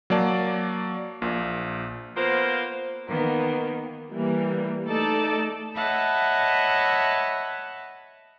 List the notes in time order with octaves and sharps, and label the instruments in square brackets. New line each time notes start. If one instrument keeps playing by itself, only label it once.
[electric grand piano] F#3 A#3 D5 A5
A#1 A#2
[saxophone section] A#3 B3 F4 C5
[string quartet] D#3 A#3 B3
[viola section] E3 G3 A#3
A3 D#4 A4 D5 A5
[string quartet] C#5 D#5 E5 F#5 A5 B5